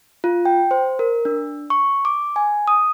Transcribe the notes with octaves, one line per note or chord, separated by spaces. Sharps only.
F4
G5
C5
A#4
D4
C#6
D6
G#5
D#6